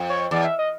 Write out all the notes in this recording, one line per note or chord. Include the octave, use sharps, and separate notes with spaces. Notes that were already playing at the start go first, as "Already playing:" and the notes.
Already playing: F2
C#5
E2 D5
E5
D#5